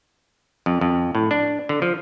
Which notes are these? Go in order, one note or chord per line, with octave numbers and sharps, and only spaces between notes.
F2
F2
A2
D4
D3
F3